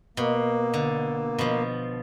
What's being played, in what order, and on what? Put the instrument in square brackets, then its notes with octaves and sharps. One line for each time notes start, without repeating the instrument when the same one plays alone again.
[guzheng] B2 [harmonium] A#3
[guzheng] D3
B2 F3